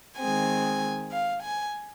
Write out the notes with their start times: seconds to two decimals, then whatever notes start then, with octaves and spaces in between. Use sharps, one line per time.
0.18 D#3 G#3 C4 G#5
1.12 F5
1.43 G#5